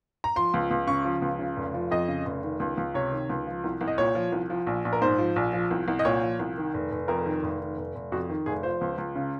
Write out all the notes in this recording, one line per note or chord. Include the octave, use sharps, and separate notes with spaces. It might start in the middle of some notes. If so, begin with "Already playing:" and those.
A#5
F3 C6
C#2
C#2
C#3 C#6
F3
C#2
C#3
F1
F3
F2 D#5
C#3
F1
D#3
C#2
C#2
C3 C#5
D#3
C#2
F3
C2
C2
D#5
A#2 C#5
F3
C2
F3
A#1
A#1
A#4
G#2 C5
F3
A#1
F3
C2
C2
D#5
A#2 C#5
F3
C2
D#3
F1
F1
F2 A#4
D#3
F1
D#3
F1
F1
F2 F#4
D#3
F1 G#4
F3 C5
C#2
C#2
C#3